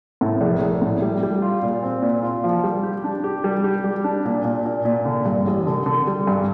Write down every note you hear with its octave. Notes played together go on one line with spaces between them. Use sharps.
A2
A#1
A#1
A2
G3
G3
F4
A#2
C4
A#2
F4
F3
G3
G4
D4
G4
G3
G4
G3
D4
A#2
A#2
A#2
A#2
D3
G2
A1
D3
D3
G3
G2